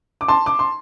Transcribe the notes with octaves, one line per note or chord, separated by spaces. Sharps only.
D6
A5 C6
D6
C6